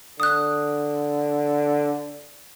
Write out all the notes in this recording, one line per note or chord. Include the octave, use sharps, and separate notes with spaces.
D3 D#6 F#6